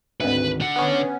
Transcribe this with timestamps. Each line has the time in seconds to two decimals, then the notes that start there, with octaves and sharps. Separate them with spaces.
0.20 G#1 D2 B4
0.60 D3 F#5
0.76 B3 C#4